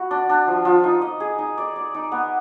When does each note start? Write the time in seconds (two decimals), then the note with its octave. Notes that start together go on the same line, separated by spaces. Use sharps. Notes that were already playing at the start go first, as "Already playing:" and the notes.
Already playing: B3 F#4
0.11 D4
0.29 D4
0.48 F3
0.65 F3
0.84 D#4
1.02 D#5
1.20 G#4
1.38 D#4
1.58 D5
1.76 D5
1.94 D#4
2.12 B3